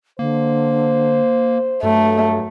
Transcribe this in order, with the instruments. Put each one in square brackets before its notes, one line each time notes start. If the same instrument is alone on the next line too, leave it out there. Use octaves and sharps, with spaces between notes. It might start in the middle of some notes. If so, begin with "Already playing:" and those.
[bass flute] D3 [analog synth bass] A#3 [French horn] C5
[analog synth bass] G2 [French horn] F#3 [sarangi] A3 [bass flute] A4